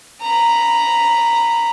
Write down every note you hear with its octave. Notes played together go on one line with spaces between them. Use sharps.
A#5 B5